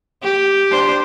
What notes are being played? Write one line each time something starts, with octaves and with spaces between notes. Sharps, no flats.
G4
D4 C5